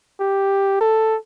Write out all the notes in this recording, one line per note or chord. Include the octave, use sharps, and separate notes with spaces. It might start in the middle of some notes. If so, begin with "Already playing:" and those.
G4
A4